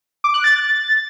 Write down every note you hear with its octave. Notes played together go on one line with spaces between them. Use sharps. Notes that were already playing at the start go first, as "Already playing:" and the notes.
D6
F#6
A6